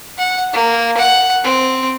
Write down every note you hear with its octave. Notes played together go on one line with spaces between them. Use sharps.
F#5
A#3
F#5
C4